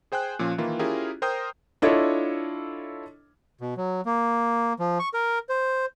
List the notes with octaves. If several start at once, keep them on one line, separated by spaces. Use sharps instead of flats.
G#4 C5 G5 G#5 F#6
A#2 F3 C#4 F4
D#3 E3 A#3 E4 F4
C#4 E4 F4 G4 G#4 A#4
A#4 C5 G5 A#5 D#6 G6
D4 E4 F4 A4 C#5 D#5
B2
F#3
A#3
F3
C#6
A#4
C5